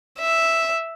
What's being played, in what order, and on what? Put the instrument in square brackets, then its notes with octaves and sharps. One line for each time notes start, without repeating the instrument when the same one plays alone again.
[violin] E5